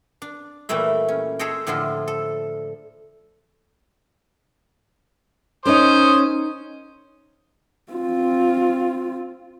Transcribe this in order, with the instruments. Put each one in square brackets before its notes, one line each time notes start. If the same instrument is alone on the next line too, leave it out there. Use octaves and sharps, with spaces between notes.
[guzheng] D4
A#2 E3 G3 A3 E4
C#4
G#4 A4 C5 C#5 D#5 G5
A2 D3 F3 E4 F4
A4
[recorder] C#4 [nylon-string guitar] D#4 A#4 [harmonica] C5 D#6
[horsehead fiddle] C4 F4